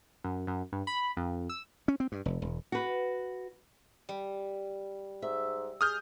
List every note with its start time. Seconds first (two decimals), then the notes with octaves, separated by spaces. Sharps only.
0.24 F#2
0.47 F#2
0.72 G2
0.87 B5
1.17 F2
1.50 E6
1.88 C#4
2.00 C4
2.12 G2
2.26 F1
2.42 E1
2.72 F#4 B4
4.09 G3
5.22 G#2 E5
5.81 G#4 D#6 F6 G6